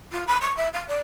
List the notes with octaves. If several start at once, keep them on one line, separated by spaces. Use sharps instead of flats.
F4
B5
C#6
E5
F5
D5